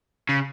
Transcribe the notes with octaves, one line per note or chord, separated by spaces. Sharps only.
C#3